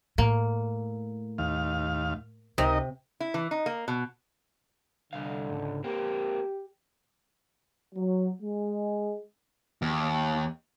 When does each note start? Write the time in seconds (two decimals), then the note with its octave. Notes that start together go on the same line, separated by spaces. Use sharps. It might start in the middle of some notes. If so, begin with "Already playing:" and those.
0.18 A2 A#3
1.38 D#2 F5
2.58 C#2 C3 D#4 A#4 D#5
3.20 E4
3.34 E3
3.51 D#4
3.66 A#3
3.88 B2
5.13 C2 D3 F5
5.50 C#2 G#2
5.84 A#3 C4 G4
7.94 F#3
8.42 G#3
9.82 D#2